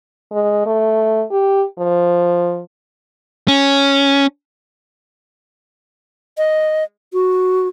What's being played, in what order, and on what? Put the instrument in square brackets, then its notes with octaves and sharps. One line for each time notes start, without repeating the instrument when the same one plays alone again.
[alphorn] G#3
A3
G4
F3
[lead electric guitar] C#4
[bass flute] D#5
F#4